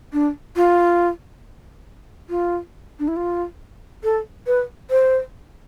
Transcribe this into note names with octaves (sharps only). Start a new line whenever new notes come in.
D4
F4
F4
D4
E4
F4
A4
B4
C5